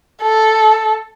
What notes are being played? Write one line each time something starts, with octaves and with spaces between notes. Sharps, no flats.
A4